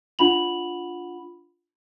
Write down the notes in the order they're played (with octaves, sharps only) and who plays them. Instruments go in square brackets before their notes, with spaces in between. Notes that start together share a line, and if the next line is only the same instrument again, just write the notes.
[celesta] D4 F4 F#5 B5 F7 F#7